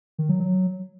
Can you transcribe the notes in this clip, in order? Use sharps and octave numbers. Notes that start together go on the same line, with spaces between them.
D#3
F#3
F#3